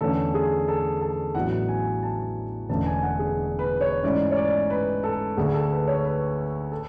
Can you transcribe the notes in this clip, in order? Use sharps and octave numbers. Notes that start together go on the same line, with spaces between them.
E2 D3 A3 C#4 A4
G#4
A4
A4
A1 A2 F#3 B3 D4 F#5
G#5
A5
E1 E2 D3 A3 C#4 A5
G#5
F#5
G#4
B4
C#5
G#2 E3 A3 C#4 D5
C#5
D5
B4
A4
D2 D3 A3 G#4
A4
B4
C#5
B4
A4